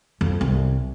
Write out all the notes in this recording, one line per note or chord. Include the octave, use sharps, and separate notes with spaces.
F2
C2